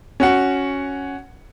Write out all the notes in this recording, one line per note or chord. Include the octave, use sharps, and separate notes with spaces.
C#4 F#4 F#5